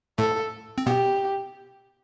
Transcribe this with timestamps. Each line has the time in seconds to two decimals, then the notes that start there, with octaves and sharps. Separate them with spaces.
0.18 A2 A3 A4
0.78 C4
0.86 B2 B3 G4